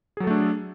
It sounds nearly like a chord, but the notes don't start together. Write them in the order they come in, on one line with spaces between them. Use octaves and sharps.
G#4 F#3 A4 A3 D4